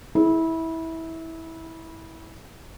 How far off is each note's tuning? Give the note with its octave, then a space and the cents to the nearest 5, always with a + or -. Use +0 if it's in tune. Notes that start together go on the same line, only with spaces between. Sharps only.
E4 -20 G#4 +35